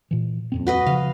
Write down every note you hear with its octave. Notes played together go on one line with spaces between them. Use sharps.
A#2 E3
D#1 F2 C4
F#4 B4 D#5
C#3 F3 F5